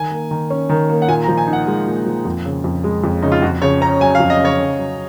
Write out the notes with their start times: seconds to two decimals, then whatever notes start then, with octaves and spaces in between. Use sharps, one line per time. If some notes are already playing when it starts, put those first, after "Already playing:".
Already playing: D#3 G#5
0.11 A#3
0.31 D#3
0.50 C#4
0.69 D#3
0.89 A#3
1.02 F#5
1.08 A#2 G#5
1.24 A#5
1.28 F3
1.38 G#5
1.47 D#4
1.53 F#5
1.67 G#3
1.86 A#2
2.06 F3
2.25 F2
2.45 C#3
2.64 F2
2.84 G#3
3.04 F2
3.22 C#3 D#4
3.32 F4
3.42 F2 F#4
3.62 C#3 C#5
3.81 C#4 A#5
4.01 F#3 G#5
4.15 F5
4.20 F2
4.30 D#5
4.40 C#3 C#5
4.60 C#3
4.78 F#3